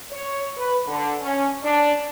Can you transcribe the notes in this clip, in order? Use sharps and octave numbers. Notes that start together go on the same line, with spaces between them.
C#5
B4
D3
C#4
D4